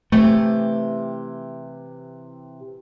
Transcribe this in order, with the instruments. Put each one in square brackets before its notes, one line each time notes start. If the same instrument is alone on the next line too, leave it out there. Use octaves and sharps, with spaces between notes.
[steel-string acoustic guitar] C3 E3 G4 [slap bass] A3